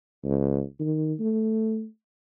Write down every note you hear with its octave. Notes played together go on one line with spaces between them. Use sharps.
C#2
D#3
A3